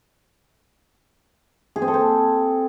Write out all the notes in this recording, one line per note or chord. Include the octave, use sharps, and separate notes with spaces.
G#4
C4
A4
C4